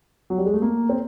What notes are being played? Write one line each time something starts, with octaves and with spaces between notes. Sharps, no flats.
F#3
G3
G#3
A3
A#3
C4